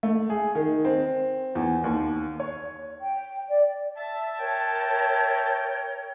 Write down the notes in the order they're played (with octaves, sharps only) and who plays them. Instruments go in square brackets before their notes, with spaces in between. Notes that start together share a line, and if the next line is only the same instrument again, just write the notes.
[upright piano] A3
G#4
D#3
C4
E2
D#2
C#5
[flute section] G5
D5
[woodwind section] E5 A5
[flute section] A#4 C#5 [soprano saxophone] G5